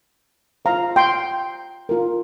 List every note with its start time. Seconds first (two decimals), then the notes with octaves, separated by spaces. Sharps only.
0.65 F4 C5 F5 A#5
0.96 G5 C6
1.89 F4 A#4